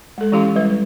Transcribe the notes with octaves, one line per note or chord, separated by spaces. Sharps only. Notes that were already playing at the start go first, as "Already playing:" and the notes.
G#3 A4
E3 C#4 E4 G4 F5 C6
G3 G#3 G4 B4